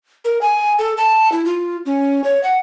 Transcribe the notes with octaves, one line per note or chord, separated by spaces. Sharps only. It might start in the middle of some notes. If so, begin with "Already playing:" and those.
A#4
G#5
A4
A5
E4
F4
C#4
C#5
F#5